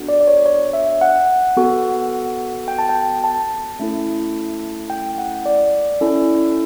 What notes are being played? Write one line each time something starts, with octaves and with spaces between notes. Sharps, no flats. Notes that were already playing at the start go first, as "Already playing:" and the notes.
Already playing: B3 D4 F#4 A4
D5
D5
C#5
C#5
E5
F#5
B3 F#4 A4
G5
A5
G5
A5
A3 C#4 E4 A4
G5
F#5
D5
C#4 E4 A4